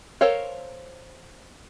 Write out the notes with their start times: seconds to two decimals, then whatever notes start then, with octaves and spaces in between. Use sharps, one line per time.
0.21 A4 A#4 C5 C#5 F5